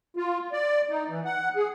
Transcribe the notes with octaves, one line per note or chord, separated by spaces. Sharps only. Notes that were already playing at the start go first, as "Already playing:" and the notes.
F4
D5
D#4
E3
F#5
G#4